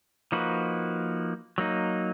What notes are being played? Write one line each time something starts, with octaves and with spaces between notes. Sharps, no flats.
F3 A#3 D#4 F#4 B4
F#3 A#3 D#4